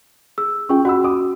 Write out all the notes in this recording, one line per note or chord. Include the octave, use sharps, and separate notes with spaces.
G#4 E6
C#4 F4 G#4 G5 C#6
F#4 F#5 B5 E6
D6 D#6